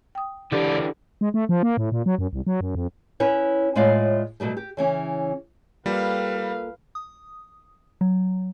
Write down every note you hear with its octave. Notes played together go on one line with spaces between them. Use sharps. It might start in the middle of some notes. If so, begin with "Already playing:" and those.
G5 D#6
C#2 D3 E3 D4 G4 D5 D6
G#3
A3
F3
A#3
A2
A#2
F#3
F#2
C2
F#3
F#2
F2
C#4 E4 B4 C#5
A2 G#3 F4 C#5 D5 F5
B2 F#3 G3 A3
G4
C#3 E3 C#4
G3 A#3 F4 A4 B4 F5
D#6
F#3